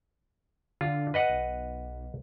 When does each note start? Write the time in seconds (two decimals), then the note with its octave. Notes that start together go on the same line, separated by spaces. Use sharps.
0.81 D3 F4
1.14 B4 D#5 F#5
1.29 B1